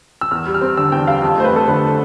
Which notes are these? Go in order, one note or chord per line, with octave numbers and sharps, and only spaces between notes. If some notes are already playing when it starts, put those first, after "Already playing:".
E6
E2 F6
G3
F6
C4
D3 E6
E2 G5
G3 F5
F2
A3 C5
B4
F2 A4
D3 B4